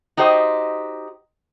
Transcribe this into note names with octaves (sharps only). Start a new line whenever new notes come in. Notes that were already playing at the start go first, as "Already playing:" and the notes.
D#4 F#4 G4 C5 D#5